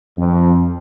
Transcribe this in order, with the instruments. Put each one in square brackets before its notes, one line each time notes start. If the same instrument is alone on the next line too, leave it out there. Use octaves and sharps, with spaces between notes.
[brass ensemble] F2